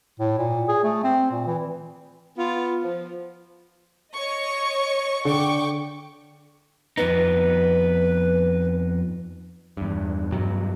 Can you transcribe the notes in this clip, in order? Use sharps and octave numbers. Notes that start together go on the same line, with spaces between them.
A2
A#2
G#4
A3
C4
A#2
E3
B3 F4
F3
C#5 D#5 C#6
D3 G5 C#6 D6
F2 B3 D#4 B4
E2 G2
G2 B2 F#3